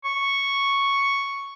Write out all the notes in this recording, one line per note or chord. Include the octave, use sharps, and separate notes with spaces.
C#6